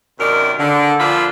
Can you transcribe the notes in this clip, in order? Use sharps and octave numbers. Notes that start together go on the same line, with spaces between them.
F#2 C3 D#3 A#4 D5
D3
A#2 F3 D4 F4 B5